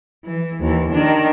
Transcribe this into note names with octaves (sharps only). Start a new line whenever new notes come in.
E3
D#2 E3
D#3 D4